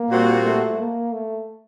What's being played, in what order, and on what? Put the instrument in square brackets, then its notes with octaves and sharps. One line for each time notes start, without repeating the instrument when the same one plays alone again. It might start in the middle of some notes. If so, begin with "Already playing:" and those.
Already playing: [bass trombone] A#3
[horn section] A#2 G3 C4 F#4
[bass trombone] A3
A#3
A3